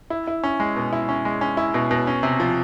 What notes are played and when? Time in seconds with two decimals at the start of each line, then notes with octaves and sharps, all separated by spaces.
0.10 E4
0.27 E4
0.44 C#4
0.60 G#3
0.76 B2
0.93 E4
1.09 C#4
1.25 G#3
1.41 C#4
1.57 E4
1.74 B2
1.91 B2
2.07 C#4
2.23 C3
2.40 F3